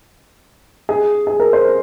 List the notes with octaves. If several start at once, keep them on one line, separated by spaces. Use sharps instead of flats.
G#4
G#4
A#4
C5